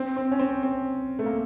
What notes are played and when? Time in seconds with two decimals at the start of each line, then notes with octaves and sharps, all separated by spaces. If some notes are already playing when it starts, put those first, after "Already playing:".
Already playing: C4
0.17 C4
0.32 C#4
0.39 C4
0.63 C4
1.19 A3
1.26 A#3